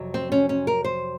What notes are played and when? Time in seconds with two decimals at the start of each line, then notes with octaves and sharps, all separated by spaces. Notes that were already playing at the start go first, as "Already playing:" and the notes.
Already playing: F2 C3 F#3
0.14 C4
0.32 C#4
0.49 C#4
0.67 A#4
0.84 C5